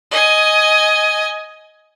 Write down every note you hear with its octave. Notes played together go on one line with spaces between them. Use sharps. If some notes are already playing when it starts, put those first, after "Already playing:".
D#5 G#5